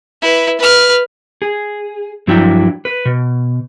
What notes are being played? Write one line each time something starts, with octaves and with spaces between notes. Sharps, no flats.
E4 B4
B4 F6
G#4
G2 F3 F#3 D4 E4 G5
B4
B2